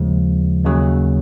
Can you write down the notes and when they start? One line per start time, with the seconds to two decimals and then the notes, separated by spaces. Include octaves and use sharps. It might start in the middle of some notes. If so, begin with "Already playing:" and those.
Already playing: D#2 C#3 F3 G#3
0.64 D#2 C#3 F#3